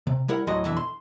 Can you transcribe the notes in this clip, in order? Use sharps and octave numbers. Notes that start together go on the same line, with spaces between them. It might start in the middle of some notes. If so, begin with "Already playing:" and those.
C3
G3 E4 A#4 F#5
D2 A2 F#3 F#4 D#5 C6
B1 F2 D3 E3 E5
C6